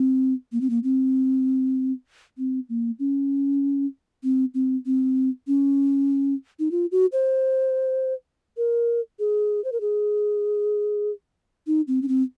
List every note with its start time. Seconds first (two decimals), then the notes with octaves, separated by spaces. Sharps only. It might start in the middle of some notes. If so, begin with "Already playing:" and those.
Already playing: C4
0.52 A#3
0.61 C4
0.70 A#3
0.84 C4
2.38 C4
2.69 A#3
2.99 C#4
4.23 C4
4.54 C4
4.86 C4
5.47 C#4
6.59 D#4
6.71 F4
6.92 F#4
7.12 C5
8.57 A#4
9.19 G#4
9.64 C5
9.72 A#4
9.81 G#4
11.67 D#4
11.88 C4
12.02 C#4
12.08 C4